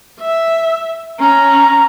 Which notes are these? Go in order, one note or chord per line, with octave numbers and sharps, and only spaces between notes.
E5
C#4 A#5